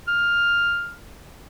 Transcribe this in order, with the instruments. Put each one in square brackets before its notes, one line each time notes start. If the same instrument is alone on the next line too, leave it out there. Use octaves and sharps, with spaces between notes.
[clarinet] F6